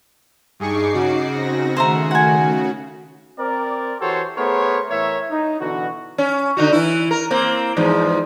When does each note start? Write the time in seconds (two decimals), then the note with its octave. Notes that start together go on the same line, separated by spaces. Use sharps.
0.60 G2 D#4 G#4 C#6 D6 C7
0.94 C#3 F#4
1.29 C4 D#4 A#6
1.77 D#3 A3 C5 E5 A#5
2.11 F#5 G#5
3.38 C4 A#4 D5
4.00 E3 F#4 G4 A4 C5 C#5
4.36 A3 B3 G#4 A#4 C5 C#5
4.90 A2 E3 A#4 C#5 E5
5.31 D#4
5.60 B2 D3 E3 F#4
6.18 C#4
6.57 D3 D#4 F#4
6.72 E3 E4
7.11 A#4
7.31 A#3 C4
7.77 E2 G#2 F3